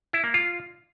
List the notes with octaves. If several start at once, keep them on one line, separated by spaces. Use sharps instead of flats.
E4
A#3
F4